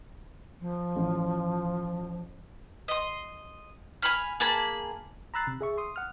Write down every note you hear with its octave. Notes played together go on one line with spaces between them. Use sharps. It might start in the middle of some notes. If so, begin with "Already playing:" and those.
F3
A1
D#5 C6
G#5 B5 F6
A#3 G#4 A5 B5
A#5 B5 E6 F#6 A6 C7
C3
G#4 E5 C#6
C6 D#6
F#5 F6